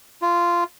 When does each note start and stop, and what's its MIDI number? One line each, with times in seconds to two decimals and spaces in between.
0.22 0.64 65